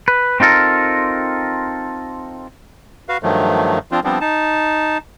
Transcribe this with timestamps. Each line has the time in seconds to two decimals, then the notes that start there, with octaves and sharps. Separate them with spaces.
0.08 B4
0.40 C4 D#4 F4 A4 A#4
3.09 F#4 B4 F5
3.23 G2 D#3 F3 F#3 A3
3.91 F3 C4 D4 F4
4.04 F3 G3 B3 C4 D4
4.21 D#4 A5